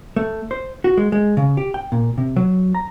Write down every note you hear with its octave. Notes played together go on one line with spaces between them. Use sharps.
A3
C5
F#4
G#3
G#3
C#3
G4
G5
A#2
C3
F#3
A#5